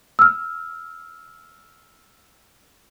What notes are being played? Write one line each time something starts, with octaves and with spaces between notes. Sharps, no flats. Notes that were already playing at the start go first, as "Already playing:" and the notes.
E6 F6